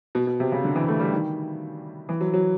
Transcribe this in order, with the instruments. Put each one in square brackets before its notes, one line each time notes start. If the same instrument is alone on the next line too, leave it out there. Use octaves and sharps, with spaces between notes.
[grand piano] B2
B2
C3
C#3
D3
E3
A3
G3
D#3
E3
F#3
F#3